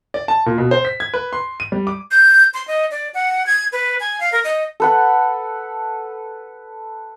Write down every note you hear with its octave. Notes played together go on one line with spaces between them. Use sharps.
D5
A5
A#2
B2
C5
B6
G#6
B4
C6
D#7
G3
D6
G6
C6
D#5
D5
F#5
G#6
B4
G#5
F5
A#4
D#5
A4 B4 F#5